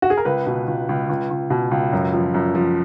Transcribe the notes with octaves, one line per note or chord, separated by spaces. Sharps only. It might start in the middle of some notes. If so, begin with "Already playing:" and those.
F#4
G#4
A#4
C#2 B4
B2
C#2
C#2
C#2
C#2
B2
C#2
F#2
F3
F#2
F3